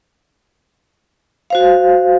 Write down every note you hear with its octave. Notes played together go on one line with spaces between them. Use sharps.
F#4 C5 F5